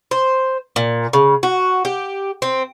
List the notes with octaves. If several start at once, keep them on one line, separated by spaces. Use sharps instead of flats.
C5
A#2
C#3
F#4
G4
C4